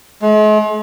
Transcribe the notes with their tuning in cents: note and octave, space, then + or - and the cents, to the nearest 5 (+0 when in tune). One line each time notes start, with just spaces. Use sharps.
G#3 +45